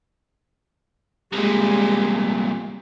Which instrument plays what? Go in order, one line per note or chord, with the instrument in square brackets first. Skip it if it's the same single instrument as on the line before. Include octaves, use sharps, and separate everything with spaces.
[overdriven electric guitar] C2 A#2 [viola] G#3 G4